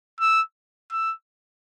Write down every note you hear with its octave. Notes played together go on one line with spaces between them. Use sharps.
E6
E6